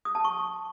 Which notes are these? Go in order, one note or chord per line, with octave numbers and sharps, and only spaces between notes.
D#6
A5
C#6